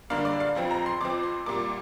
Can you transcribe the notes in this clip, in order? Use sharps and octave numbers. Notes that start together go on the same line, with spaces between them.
G2 D3 A#3 D4 F5
D5
F5
F1 F2 F3 C4
A#5
C6
F2 F3 C4 D6
C6
C2 A#2 G3 A#3 D6